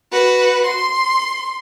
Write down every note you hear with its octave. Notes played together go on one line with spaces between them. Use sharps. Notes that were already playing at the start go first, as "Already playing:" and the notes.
F#4 B4
C6